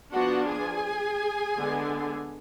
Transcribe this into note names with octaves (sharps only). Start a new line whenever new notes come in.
F3 B3 D4 F#4 F#5
G#4 G#5
D3 G#3 B3 D4